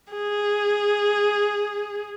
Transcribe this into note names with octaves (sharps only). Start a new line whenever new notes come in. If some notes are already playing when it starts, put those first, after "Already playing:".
G#4